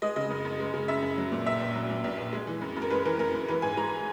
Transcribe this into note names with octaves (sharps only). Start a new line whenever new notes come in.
G#3 D#5
C#3 D#5
F#2
F#2
G#3
C#3
F#2 E5
F#2
F#3
A#2
A#1 E5
A#1
F#3
A#2
A#1
A#1
G#3
E3
F#2
F#2
A#4
G#3 B4
E3 A#4
F#2 A#4
F#2
E3 B4
G#2 G#5
G#3 A#5